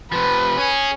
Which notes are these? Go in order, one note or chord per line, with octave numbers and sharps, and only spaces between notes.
C3 F3 B4
C#4 G#4